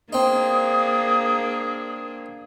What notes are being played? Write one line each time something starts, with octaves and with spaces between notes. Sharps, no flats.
A#3 C4 D4 D#4 G#4 D#6